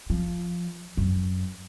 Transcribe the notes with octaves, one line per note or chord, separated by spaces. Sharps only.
F3
F#2